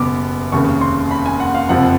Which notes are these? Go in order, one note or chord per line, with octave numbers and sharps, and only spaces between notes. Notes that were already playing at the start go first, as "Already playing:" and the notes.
Already playing: F#1 E2 B2 G3 B3 D6
F1 D#2 C#3 C#6
C6
B5
G#5
F#5
F5
F#1 F2 C3 F3 F#5